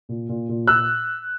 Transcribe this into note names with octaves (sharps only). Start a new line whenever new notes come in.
A#2
A#2
A#2
A#2 E6 F#6